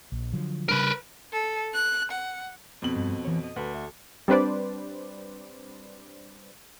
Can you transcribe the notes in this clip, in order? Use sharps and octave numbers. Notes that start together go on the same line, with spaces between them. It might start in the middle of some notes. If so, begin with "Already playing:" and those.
A#1
D3 F3 F#3
C#3 G3 D4 A#4 B4
A4
F#6
F#5
F2 B2 F#7
G2
E3 C#5
D#5
D2 A4 B4
E5
G3 C4 D4 B4 C5 D5